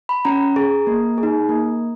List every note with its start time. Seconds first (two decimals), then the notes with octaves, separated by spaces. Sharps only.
0.09 B5
0.25 C#4 A#5
0.56 G#4
0.87 A#3
1.18 G#4
1.23 D#4
1.49 A#3